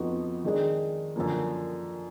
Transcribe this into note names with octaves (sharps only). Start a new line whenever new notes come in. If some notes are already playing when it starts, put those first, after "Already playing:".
Already playing: F2 F3 B3 D#4 F#4
D#3 G#3 D4 G#4
F#2 D3 F3 A#3